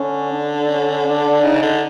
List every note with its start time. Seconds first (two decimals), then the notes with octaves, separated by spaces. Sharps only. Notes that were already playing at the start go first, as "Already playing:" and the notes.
Already playing: D3 C#4
0.31 D4
0.68 C#4
1.05 D4
1.43 C#3 D#4
1.62 D3